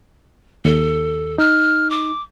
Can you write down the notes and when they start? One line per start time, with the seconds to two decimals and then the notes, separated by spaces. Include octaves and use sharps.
0.65 D#2 A4
1.38 D#4 F6
1.90 D6